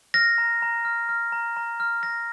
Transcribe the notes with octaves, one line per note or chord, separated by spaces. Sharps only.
F6 A#6
A#5
A#5
F6
F6
A#5
A#5
F6
F6 A#6